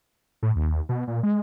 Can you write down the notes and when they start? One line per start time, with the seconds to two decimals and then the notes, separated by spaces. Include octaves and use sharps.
0.43 A2
0.56 D#2
0.89 B2
1.08 A#2
1.23 G#3